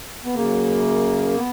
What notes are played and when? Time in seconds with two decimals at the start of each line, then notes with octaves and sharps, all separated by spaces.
0.25 B3
0.35 F#2 C#3 A#3
1.35 B3